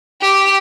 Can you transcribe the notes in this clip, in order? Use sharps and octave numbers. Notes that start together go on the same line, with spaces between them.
G4